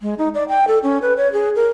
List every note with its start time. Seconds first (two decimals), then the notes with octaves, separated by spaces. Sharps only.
0.01 G#3
0.18 D#4
0.35 D5
0.49 G5
0.68 A4
0.83 C#4
1.02 B4
1.17 C#5
1.33 G#4
1.56 A#4